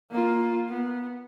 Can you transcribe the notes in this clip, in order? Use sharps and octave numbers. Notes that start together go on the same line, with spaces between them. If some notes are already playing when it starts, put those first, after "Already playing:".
A#3 F4
B3